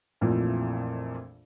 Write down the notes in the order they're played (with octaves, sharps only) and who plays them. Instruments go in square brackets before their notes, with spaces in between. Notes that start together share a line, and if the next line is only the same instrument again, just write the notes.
[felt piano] A#1 F2 A#2 E3 F3 A3